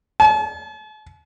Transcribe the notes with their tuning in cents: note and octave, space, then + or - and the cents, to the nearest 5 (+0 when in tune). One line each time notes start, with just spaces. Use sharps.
A5 -45